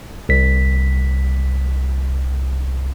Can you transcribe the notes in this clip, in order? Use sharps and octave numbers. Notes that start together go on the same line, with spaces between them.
C2 B6